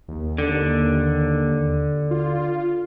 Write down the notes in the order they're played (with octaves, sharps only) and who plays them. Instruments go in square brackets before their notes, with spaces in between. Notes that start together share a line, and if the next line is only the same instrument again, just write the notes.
[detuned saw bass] D#2
[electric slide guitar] D3
[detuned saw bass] F4